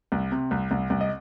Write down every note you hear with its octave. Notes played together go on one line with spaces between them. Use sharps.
C2
C3
C2
C2
C2
D#5